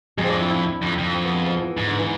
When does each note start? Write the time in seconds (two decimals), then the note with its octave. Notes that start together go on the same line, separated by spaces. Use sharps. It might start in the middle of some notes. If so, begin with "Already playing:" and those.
0.18 F2 G#3
0.24 C4 D4
0.40 E4
0.50 E4
0.66 E4
0.82 F2 D4
0.98 F2
1.14 C4
1.24 B3
1.34 G#3
1.46 F3
1.62 E3
1.77 G#2
1.88 D3
1.99 E3